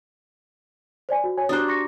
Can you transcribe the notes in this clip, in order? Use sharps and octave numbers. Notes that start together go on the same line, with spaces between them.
C5 D5 G#5
F#4
C#5 G#5
D4 F#4 G4 C5 A#5 D#6 F#6
C#6 A#6 C#7